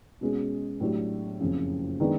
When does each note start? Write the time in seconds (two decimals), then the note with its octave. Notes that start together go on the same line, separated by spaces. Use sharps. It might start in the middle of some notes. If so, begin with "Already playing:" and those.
0.21 B2 G#3 C#4
0.80 A2 F#3 A3 D4 G4
1.40 F#1 F2 C#3
2.00 D#3 G#3 B3 D4